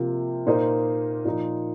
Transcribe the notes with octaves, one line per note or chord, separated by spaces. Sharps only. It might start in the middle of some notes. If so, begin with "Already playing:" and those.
Already playing: C3 F3 A#3 F4
A#2 A#3 D#4 C5 D#5
A#2 F3 D#4